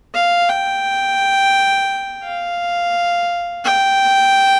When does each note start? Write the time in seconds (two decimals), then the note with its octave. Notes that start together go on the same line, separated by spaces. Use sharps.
0.15 F5
0.49 G5
2.24 F5
3.65 G5